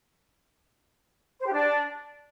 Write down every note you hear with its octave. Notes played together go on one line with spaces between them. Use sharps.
C5
G4
D4